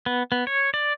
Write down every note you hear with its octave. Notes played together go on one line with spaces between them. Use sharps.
B3
B3
C#5
D5